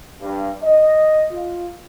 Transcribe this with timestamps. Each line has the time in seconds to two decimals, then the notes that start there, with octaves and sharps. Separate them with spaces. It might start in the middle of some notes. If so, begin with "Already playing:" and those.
0.21 G2
0.63 D#5
1.32 F4